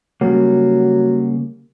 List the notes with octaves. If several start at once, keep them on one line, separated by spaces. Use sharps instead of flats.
C#3 F#3 G3 A#3